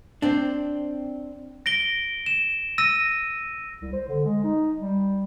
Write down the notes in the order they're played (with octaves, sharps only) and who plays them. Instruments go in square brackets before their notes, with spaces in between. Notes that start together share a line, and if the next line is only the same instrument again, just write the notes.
[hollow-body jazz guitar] C4 D4
[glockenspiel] A#6 D7 G7
E7
E6 A#6 D#7
[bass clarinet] C2
C5
D3
G#3
D#4
G3